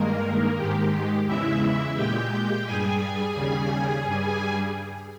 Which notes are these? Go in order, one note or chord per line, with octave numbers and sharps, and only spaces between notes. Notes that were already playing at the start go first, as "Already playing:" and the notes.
Already playing: G2 D#3 G#3 A#3 A#4
G#2 D#3 G#3 G4
E2 C#3 E3 G#3 E4 E5
A#2 G#3 G4 G5
G4 G5
G2 G3 G#4 G#5
D#2 C#3 G3
G2 G3